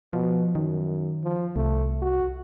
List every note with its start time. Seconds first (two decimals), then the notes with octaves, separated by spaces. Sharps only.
0.13 B2 F3
0.55 F#2 D#3
1.24 F3
1.56 C2 A3
2.02 F#4